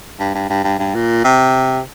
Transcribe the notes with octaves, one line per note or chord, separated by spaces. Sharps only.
G2
G2
G2
G2
G2
A#2
C3